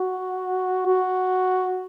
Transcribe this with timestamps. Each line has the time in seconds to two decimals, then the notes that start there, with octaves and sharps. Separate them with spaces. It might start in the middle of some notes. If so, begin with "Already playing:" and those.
Already playing: F#4
0.87 F#4